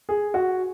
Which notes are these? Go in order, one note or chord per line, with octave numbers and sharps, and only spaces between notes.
G#4
F#4